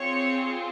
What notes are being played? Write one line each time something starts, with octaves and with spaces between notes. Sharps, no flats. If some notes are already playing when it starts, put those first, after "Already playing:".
Already playing: C4 F4 G#4 C#5